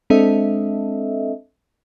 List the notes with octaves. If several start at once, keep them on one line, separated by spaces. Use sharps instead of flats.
G#3 C4 D4 A4 D#5 E5